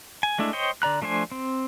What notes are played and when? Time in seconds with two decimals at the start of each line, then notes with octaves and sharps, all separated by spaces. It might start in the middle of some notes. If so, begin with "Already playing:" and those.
0.23 G#5
0.38 G#3 A3 D4 E4
0.53 C5 C#5 D#5 G5
0.82 D3 D5 A#5 F#6
1.01 F3 A3 D4 C5 G#5
1.32 C4